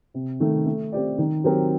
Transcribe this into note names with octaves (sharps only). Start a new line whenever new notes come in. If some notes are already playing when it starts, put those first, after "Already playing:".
C3
D#3 A3
A3
C4 G4 D5
D#3
F#3 C4 G4 A#4